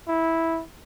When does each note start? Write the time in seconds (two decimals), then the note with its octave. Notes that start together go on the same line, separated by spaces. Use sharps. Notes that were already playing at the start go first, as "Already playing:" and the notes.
0.08 E4